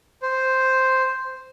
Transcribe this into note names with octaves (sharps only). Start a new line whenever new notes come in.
C5